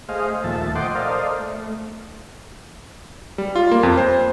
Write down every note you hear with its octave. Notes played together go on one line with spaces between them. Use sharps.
A3 G#4 C5 D#5 F5
D#2 A#2 F3 A3 E5 A5
C5 D#5 F#5 G5 C6 D6
A4 A#4 C5 D5 D#5 F5
A3
G3
F4
A#3
F2
C5